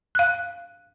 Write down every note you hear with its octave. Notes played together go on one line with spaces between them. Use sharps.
F5 F#6